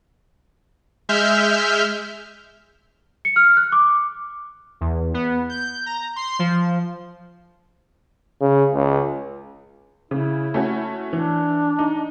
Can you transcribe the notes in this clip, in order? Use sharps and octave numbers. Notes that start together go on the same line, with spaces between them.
G#3 E5 F6 G6
C#7
F6
F#6
D6
E2
B3
G6
A#5
C6
F3
C#3
C#2
C#3 E4
A3 C#4 F#4
E3 D4
D#4